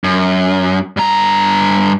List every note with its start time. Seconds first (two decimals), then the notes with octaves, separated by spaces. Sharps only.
0.04 F#2
0.97 G2 A#5